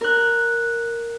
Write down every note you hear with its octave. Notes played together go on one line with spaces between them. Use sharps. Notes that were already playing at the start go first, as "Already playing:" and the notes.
A#4 F#6